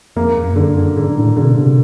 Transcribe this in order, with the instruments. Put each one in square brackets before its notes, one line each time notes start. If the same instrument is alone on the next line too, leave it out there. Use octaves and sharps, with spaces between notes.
[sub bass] F2 [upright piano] A#3
[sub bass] F#2
[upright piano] D3
[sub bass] F#2
[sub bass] G#2 [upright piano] D3
[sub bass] A2
[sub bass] B2 [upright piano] D3
[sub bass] C3